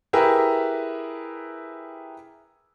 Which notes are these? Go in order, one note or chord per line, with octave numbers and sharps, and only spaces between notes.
E4 G4 G#4 A#4 B4 E5